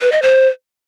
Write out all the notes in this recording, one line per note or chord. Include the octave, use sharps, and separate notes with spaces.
B4
D#5
C5